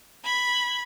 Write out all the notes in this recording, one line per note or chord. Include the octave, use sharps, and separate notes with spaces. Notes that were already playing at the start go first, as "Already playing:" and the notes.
B5 G#6